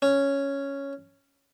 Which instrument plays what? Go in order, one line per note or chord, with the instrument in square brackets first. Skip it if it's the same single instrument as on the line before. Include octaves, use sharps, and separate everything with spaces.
[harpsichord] C#4